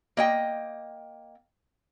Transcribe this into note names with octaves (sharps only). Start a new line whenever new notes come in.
A#3 D#5 G5